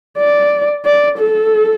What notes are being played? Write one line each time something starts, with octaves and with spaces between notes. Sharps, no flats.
D5
D5
A4